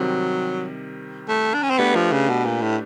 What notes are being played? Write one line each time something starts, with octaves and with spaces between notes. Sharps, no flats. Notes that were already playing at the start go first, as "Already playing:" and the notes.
Already playing: C3 D#3 F#3 G3 C4
A3
D4
C#4
C4
A3 B3 D4 G4 B4
F3
C#3
B2
A#2
A2